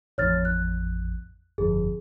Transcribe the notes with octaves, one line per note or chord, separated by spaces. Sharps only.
A1 F2 C#5 F6 A6
F#6
G1 F2 G#4